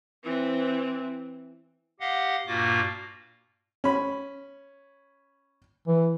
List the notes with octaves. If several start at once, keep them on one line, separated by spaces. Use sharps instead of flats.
E3 C4
G4 D#5 F5 F#5
G2 A#2 A#3 F4 F#4 D6
C#4 B5
E3